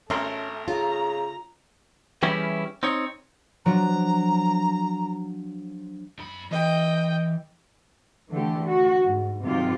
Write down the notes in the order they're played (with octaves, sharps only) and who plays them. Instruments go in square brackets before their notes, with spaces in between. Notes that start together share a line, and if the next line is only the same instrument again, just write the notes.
[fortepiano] G#1 A#4 C6 [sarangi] A3 [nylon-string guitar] C#4
[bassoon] C#3 [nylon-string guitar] F4 [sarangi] A#5
[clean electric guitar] E3 G3 C#4 E4 G4 G#4
C4 D#4 C#5
[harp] F3 F#3 D4 [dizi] A#5
[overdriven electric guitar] F#2 B5
[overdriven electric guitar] E3 [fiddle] D#5 G5
[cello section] D3 E3 A3 G4
F#4
G#2
G#2 C3 D#3 F#3 F4 G4